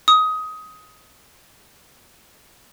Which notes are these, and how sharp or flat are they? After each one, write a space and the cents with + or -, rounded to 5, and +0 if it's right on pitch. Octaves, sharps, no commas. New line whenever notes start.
D#6 +20